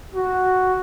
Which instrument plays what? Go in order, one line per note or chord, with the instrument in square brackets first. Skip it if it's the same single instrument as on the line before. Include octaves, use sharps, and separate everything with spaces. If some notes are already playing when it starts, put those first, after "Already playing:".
[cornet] F#4